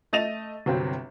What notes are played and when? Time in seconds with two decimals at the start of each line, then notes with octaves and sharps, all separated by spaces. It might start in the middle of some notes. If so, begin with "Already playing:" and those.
0.13 A3 D#5 A6 D#7 F7
0.66 G1 C3 F#3 C4